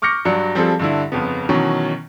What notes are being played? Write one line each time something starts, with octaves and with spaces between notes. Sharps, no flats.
C#6 D6 F6 G6 A#6 C#7
G2 F#3 D5 C#7
F3 G3 C4 G#4 A4
G2 D3 E4
G1 F2 C#3 B3
B2 D#3 E3 F#3 C#4